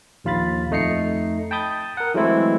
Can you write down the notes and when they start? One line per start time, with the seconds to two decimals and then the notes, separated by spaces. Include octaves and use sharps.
0.24 A#1 D#2 F4 F5 B5 A6
0.71 F2 A3 D#4 A#5 C7 C#7
1.51 G5 A5 B5 D#6 G6 A6
1.97 A#4 F#5
2.14 E3 F#3 G#3 A3 C4 E4